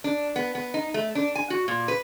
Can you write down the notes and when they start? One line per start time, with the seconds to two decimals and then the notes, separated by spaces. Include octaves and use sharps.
0.04 D4
0.36 B3
0.55 B3
0.74 D#4
0.94 A3
1.15 D4
1.35 G#5
1.50 F#4
1.68 A#2
1.88 B4